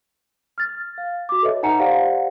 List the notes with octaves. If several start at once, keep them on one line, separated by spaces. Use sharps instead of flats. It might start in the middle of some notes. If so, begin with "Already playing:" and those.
F6 A6
F5
F#4 D6
A4 B4 C#5 D#5 E5
D#4 F#5 G#5 A#5 C#7
G4 C5 D5 F5 F#5